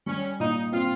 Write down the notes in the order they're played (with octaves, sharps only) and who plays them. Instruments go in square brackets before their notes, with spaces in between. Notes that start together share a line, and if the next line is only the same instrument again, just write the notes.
[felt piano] G3 [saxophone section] C#4
[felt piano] A#2 [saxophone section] D#4
[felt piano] C4 [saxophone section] F4